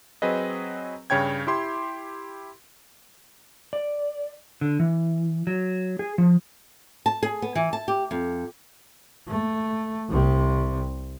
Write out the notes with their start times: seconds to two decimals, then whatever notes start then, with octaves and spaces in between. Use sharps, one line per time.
0.22 F#3 C4 G#4 B4 D#5
1.10 G2 C#3 C#5 G5 G#6
1.47 E4 G4 C6
3.73 D5
4.61 D3
4.80 E3
5.47 F#3
5.99 G#4
6.18 F3
7.06 A5
7.23 G#4
7.42 B3
7.55 E3
7.73 A5
7.88 G4
8.11 F2
9.28 A3
10.09 C2 C3